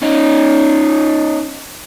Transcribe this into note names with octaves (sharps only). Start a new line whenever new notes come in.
C#4 D#4